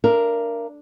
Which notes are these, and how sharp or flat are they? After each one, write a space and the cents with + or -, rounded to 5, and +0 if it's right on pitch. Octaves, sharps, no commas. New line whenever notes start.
D4 +0 A#4 +0 F5 -45